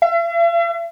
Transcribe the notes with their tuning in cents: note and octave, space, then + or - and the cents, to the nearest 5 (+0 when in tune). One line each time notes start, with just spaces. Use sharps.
E5 +45